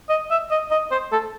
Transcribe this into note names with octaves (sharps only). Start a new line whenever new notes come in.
D#5
E5
D#5
D#5
C5
A4